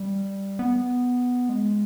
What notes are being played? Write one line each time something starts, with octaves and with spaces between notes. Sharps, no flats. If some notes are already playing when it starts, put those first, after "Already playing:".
Already playing: G3
B3
G#3